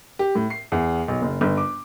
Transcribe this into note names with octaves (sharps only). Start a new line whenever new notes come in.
G4
A2
C7
E2
B1
F#1
G1
D6